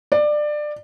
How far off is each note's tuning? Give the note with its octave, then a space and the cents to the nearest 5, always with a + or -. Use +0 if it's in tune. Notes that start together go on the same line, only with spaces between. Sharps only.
D5 +20